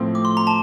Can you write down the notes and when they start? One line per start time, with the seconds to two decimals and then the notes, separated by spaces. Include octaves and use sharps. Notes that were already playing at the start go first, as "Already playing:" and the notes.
Already playing: A2 F3 A3 C4
0.15 D6
0.25 C6
0.37 A#5
0.47 A5